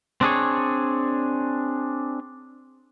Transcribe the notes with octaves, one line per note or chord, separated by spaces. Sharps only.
C4 D4 G#4 C#5